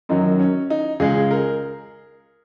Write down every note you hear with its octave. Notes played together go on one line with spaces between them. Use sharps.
F#2 D#3 F#3 D#4
C#4
D#4
C#2 C#3 G#3 G#4
A#4